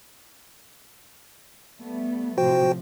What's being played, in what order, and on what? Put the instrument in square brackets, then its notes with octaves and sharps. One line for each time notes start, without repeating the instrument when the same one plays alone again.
[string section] G3 A3 B3
[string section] A2 C3 F3 [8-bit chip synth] F#4 C5 G5